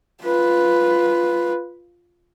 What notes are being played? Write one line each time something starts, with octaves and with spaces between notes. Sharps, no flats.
F4 B4